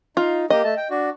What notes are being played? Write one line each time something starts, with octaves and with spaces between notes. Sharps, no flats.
D#4 F4
A#3 G4 D#5
A3 A5
G5
D4 F#4